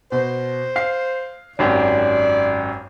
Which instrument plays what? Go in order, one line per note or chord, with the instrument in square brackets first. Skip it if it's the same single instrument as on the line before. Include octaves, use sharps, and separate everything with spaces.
[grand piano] B2 [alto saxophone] C5
[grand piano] F5 C7
[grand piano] G#1 F#2 G4 [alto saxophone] D5